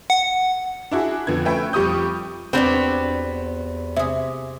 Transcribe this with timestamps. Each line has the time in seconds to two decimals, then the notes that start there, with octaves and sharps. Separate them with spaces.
0.10 F#5
0.91 D4 E4 F#4 G#4
1.27 F2 D3 B3 G#6
1.45 A3 C#4 B4 E5 G5
1.73 F2 G3 G4 C#6 D#6 G6
2.53 E2 B3 C4 D4 F#4 G4 B4 D5
3.96 C3 G#4 E5